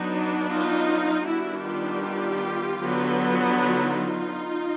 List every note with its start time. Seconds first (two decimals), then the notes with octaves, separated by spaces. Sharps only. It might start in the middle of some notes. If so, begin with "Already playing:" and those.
Already playing: F#3 B3 D4 D#4
0.48 D#4 F4
1.26 D#3 G3 B3 D4 E4 F#4
1.65 F4 G4
2.81 D3 F#3 B3
3.59 D#4 F4